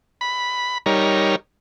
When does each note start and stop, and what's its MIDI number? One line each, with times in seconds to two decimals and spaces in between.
0.21 0.78 83
0.86 1.36 55
0.86 1.36 63
0.86 1.36 70
0.86 1.36 73